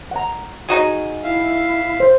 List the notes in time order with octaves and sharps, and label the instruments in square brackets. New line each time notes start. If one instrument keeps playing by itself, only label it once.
[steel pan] F#5 A#5
[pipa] D#4 F#4 G#4
[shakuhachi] E4 [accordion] E5 F5
[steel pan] C5